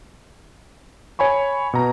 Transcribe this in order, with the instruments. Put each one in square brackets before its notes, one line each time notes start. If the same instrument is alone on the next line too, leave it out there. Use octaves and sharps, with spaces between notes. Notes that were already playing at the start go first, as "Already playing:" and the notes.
[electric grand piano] C#5 G#5 B5 C#6
B2 A#5